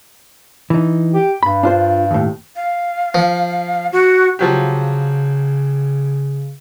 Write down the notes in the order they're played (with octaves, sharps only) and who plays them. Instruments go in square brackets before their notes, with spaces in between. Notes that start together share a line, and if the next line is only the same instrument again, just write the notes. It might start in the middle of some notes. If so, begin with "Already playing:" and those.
[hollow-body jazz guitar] E3 D#4
[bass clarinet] G4
[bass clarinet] G2 [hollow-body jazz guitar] B5
[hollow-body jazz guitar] D4 F4 C5
D#2 A2
[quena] F5
[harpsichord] F3
[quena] F#4
[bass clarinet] C#3 [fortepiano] F3 F#3 G4